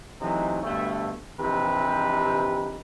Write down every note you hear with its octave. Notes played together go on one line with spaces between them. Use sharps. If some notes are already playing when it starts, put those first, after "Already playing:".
C3 E3 F#3 A3 D#4
D2 G2 B2 A3
A#1 C3 E3 D#4 G4 B4